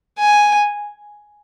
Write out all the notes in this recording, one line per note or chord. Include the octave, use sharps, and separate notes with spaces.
G#5